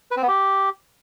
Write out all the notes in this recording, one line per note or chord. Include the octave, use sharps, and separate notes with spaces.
B4
C4
B3
G4